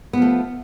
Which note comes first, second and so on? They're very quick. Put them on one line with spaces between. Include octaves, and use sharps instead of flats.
B3 F3 A3